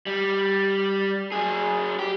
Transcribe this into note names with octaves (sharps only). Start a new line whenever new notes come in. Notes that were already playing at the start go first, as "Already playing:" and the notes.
G3
F#3 G#4
G4